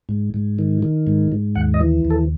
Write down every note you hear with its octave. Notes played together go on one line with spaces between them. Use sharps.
G#2
G#2
D#3
D#3
G#2
G#2
D#2 F#5
D#5
E3
D#2
A4